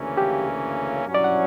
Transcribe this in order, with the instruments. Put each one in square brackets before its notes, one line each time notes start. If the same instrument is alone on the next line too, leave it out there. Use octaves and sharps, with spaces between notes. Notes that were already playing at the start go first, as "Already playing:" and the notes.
Already playing: [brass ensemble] D2 C#3 E3 A#3 C#4
[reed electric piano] G4
[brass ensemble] G2 F#3 C#4 E4
[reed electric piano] D5
F#5